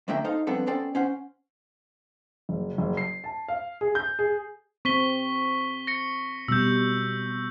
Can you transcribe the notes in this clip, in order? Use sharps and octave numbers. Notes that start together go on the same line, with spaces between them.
F2 D3 A3 A#3 E5 G5
D#4 A4 C5 F5
F3 G3 B3 C4 D4 A4
B3 C#4 A4 C5 D5 G5
C#4 C5 F#5
F#1
F#1
C7
A5
F5
G#4
G6
G#4
C4 C#6 B6 G7
A#6 C#7
B2 G3 E6 G6